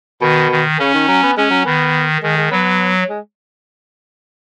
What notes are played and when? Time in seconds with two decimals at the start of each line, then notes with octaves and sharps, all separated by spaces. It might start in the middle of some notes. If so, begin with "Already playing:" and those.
0.21 B2 D#3
0.51 D#3
0.79 C#3 C#4
0.94 D#3
1.08 F#3
1.23 B3
1.37 G#3 C#4
1.51 F#3
1.65 D#3 B3
2.22 D#3 G#3
2.37 G#3
2.51 F#3 B3
3.09 G#3